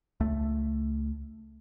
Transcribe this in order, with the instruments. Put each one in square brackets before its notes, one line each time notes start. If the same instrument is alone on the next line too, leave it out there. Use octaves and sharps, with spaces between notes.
[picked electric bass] C#2 A3